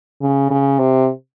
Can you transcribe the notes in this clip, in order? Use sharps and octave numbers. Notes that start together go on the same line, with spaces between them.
C#3
C#3
C3